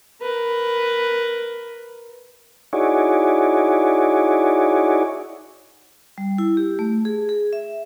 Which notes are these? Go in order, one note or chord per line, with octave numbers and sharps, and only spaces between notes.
A#4 B4
D#4 E4 F#4 G#4 C#5 D5
G3
E4
G4
A3
G#4
G#4
E5